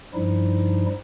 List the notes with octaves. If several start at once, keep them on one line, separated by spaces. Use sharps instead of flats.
G2 F3 G3 D#4 E4